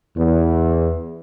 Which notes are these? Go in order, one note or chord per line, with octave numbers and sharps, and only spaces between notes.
E2